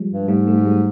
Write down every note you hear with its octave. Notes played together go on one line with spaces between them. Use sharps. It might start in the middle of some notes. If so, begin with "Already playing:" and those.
Already playing: F3 G3 G#3
G2
G#2 G3 A3
G3 A3
G3
F#3 G#3